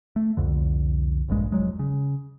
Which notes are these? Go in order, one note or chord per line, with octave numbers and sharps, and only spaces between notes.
A3
C2 F2 D3
F1 A#1 G2 G#3
F1 F#2 F#3 G#3
C#3